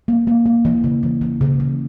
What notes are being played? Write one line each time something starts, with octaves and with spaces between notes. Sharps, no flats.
A#3
A#3
A#3
E3
C#3
E3
E3
C#3
C#3